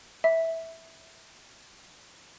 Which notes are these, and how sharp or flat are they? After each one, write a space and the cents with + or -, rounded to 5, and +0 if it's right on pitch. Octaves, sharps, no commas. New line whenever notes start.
E5 -10